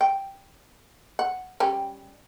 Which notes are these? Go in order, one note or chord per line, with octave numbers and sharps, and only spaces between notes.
G5
F#5
G3 C#4 G5